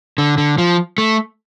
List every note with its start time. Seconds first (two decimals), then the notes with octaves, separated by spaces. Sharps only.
0.18 D3
0.38 D3
0.58 F3
0.98 A3